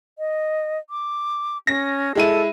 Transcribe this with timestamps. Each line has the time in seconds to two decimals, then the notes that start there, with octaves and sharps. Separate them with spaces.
0.19 D#5
0.90 D6
1.67 C#4 A#6
2.15 G#3 E4 A4 D#7